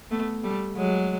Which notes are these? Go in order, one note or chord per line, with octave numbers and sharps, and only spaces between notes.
A3 B3
G3 A3
F#3 G#3